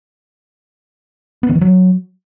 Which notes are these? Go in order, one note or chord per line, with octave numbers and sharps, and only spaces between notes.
B3
D#3
E3
F#3